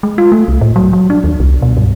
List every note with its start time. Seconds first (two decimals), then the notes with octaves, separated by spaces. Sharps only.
0.03 G#3
0.18 F4
0.32 A3
0.48 C2
0.61 A2
0.76 F#3
0.93 F#3
1.10 D4
1.24 D#2
1.40 C2
1.62 B2
1.77 G2